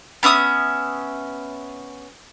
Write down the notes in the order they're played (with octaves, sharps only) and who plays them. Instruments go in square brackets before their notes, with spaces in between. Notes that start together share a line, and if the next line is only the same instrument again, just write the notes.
[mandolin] B3 C#4 E5 D#6